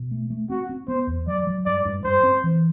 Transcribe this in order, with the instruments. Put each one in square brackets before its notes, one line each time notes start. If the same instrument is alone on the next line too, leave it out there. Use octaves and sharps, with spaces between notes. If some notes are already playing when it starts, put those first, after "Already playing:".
Already playing: [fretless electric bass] B2
A3
A3
[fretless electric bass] C4 [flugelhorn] F#4
[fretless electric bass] C4
[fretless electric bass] B3 [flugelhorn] C5
[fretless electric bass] E2
[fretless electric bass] F#3 [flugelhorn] D5
[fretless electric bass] F#3
[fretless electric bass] G2 [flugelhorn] D5
[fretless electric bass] G2
[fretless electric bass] G2 [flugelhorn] C5
[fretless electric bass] C4
E3